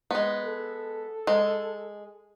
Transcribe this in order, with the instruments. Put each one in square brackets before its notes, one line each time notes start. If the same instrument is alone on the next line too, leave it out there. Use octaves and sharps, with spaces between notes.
[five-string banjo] G#3 B3
[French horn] A4
[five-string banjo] G#3